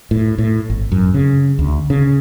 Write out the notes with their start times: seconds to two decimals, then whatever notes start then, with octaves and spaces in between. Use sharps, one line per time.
0.11 A2
0.38 A2
0.70 G#1
0.92 F#2
1.14 C#3
1.59 D2
1.90 C#3